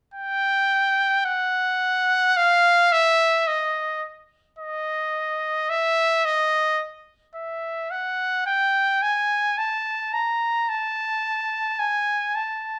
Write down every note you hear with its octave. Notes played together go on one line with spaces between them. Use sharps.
G5
F#5
F5
E5
D#5
D#5
E5
D#5
E5
F#5
G5
G#5
A5
A#5
A5
G#5
A5